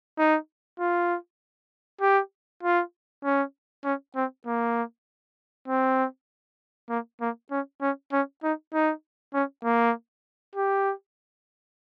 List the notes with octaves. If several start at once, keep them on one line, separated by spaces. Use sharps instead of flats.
D#4
F4
G4
F4
C#4
C#4
C4
A#3
C4
A#3
A#3
C#4
C#4
C#4
D#4
D#4
C#4
A#3
G4